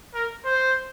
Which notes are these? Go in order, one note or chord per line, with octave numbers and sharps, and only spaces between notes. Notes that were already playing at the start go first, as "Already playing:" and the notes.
A#4
C5